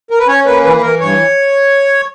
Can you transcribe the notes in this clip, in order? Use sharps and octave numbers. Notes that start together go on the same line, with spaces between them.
A#4
B4
C#4 C#5
A#3 B4
E3 B4
B4
E3 A#4
G2 C#5